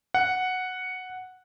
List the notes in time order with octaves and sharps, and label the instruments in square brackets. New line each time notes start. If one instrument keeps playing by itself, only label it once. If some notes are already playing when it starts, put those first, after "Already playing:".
[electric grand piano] F#5